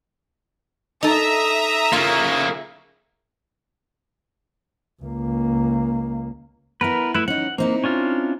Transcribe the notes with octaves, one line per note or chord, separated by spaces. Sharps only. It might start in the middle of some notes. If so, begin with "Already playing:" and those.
D#4 A4 E5 A#5 D#6
C#3 A#3 F4
C#2 A#3
B3 E4 A#4 B4
A3 E4 B4
C#4 D#4 F#5
A#3 C4 D#4 E4
C#4 D4 F4